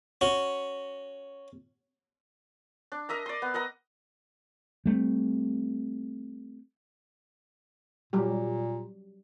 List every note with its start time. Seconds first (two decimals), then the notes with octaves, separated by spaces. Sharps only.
0.21 C#4 F#4
2.92 D4
3.09 A#4 D#5 E5 A#5
3.26 D5 C6
3.42 B3
3.54 A#4 D#5 F#5 A#5
4.86 G3 A3 B3 C4
8.13 A#2 F#3 G3 G4